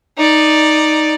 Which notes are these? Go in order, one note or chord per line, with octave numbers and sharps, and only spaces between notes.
D#4 D5